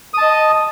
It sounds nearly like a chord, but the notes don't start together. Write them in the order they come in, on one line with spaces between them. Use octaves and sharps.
D#6 A5 D#5